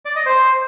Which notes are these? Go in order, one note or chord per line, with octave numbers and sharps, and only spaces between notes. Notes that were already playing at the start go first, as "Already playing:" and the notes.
D5
D#5
C5